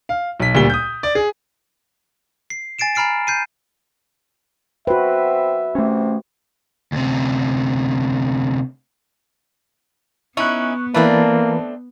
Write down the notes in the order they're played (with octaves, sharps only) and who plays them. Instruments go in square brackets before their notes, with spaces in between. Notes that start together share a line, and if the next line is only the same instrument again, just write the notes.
[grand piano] F5
B1 B6
D2 A#2 G3 B6 G7
D#6 G6
D5
G#4
[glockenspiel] C7
G#5 A6 C7 D7 E7
G#5 A#5 B5 F6 C7 D7
G6 C7 D#7
[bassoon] C4 [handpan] F#4 B4 [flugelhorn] E5
[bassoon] C3 [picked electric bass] A3 C#4
[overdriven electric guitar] D2 C3
[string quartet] B3 [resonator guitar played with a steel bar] C#4 D#4 E4 [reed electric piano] C#6 F#6
[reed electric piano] E3 B4 [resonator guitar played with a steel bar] A3 C4 D4 [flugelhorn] A#3